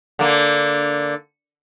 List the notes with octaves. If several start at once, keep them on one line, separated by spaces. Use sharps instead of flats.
D3 A#3